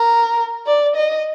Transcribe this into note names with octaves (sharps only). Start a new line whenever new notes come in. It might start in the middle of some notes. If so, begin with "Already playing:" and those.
Already playing: A#4
D5
D#5